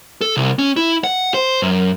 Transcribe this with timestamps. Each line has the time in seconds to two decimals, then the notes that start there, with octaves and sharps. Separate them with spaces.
0.21 A4
0.37 C2
0.59 C#4
0.76 E4
1.04 F#5
1.34 C5
1.62 F#2